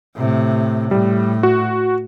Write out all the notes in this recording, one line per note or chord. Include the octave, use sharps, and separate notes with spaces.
A2 C3
A2 G3
F#4